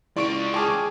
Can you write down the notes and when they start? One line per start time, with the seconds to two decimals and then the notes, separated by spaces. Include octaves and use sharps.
0.17 C#2 E4 F4 D5 C#6 D7
0.54 G#4 G5 A5 C#6 D6 F6